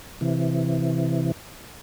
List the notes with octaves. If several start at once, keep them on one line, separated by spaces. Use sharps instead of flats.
C3 E3